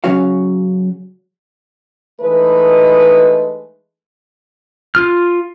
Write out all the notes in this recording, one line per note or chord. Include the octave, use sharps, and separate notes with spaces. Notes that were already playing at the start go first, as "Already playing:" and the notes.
C#3 F#3 C#4 F#4 F5
E3 G#3 A3 D#4 B4
F4 F6